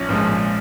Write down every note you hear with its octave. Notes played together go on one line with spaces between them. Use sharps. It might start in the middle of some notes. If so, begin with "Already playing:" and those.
Already playing: A#1 C#4
A#2 F3 G#3